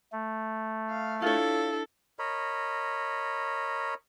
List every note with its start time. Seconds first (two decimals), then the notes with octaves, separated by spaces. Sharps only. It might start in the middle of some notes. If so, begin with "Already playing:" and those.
0.12 A3
0.89 F5
1.22 D4 E4 F4 A4 C#5
2.19 A#4 C#5 D#5 B5